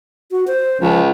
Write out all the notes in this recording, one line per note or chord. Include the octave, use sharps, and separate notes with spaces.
F#4
C5
C#2 F3